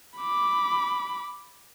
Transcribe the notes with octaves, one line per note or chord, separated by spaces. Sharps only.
B5 D6